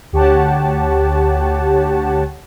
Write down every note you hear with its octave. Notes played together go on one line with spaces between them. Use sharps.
D2 G4 C#5 F#5 A5